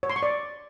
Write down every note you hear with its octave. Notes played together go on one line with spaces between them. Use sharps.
C#5
C6
C#6
D5